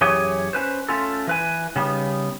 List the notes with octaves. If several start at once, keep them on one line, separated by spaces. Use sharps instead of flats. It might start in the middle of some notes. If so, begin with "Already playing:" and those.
F#2 E3 G4 G#4 C#5 G#5
C#4 B4 C5
A3 C#4 F4 A4
E3 B4 G#5
C#3 G3 B3 D#4